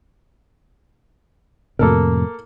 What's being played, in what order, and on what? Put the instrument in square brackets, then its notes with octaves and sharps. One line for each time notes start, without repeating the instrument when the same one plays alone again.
[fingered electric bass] F2 A2 C3 [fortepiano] A#3 A4 A#4